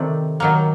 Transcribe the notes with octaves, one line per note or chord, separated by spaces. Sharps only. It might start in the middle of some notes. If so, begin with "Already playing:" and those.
Already playing: C3 D#3 A3 C4 D5
D#3 F#3 A#3